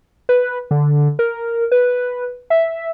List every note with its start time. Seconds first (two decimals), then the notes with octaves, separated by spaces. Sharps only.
0.29 B4
0.71 D3
1.19 A#4
1.72 B4
2.50 E5